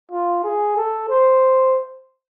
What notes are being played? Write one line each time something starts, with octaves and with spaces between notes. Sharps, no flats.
F4
G#4
A4
C5